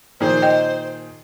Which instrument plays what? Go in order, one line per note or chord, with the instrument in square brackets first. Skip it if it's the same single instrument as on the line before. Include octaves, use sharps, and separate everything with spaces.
[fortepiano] A#2 D#3 G#4 [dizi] C5
[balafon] D#5 G5